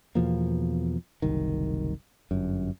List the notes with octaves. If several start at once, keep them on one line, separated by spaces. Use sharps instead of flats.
E2 B2 F3 A#3
F#1 C2 D#3
G1 F#2